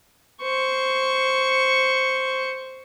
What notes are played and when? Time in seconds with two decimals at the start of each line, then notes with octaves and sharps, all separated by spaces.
0.41 C5 C#6